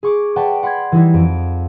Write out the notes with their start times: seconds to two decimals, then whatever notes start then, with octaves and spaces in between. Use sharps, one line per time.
0.03 G#4 C#6 D6
0.36 B4 D5 F#5 G5 A5 C#6
0.63 F#5 B5 C6 F#6 G#6
0.92 E3 G3 D#4 E4
1.14 F2 D7